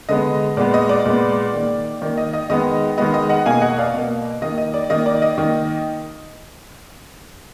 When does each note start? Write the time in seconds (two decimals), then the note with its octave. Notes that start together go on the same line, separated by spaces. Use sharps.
0.09 D3 G#3 B3 D#5
0.57 A#2 G#3 B3 D5
0.74 D#5
0.89 D5
1.05 A#2 G#3 B3
1.54 D#3 A#3
2.02 D#3 A#3 D5
2.17 D#5
2.33 D#5
2.50 D#3 G#3 B3 D#5
2.98 D#3 G#3 B3 D#5
3.14 D#5
3.29 D#5 F#5
3.46 B2 A#3 F5 G#5
3.62 D#5 F#5
3.78 D5 F5
3.94 B2 A#3
4.42 D#3 A#3 D#5
4.58 D#5
4.74 D5
4.90 D#3 A#3 D#5
5.06 D5
5.22 D#5
5.38 D#3 A#3